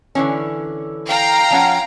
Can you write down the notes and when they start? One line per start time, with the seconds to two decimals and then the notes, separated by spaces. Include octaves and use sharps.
0.15 D3 E3 C#4
1.07 F5 G5 A#5
1.51 F3 C#4 F#5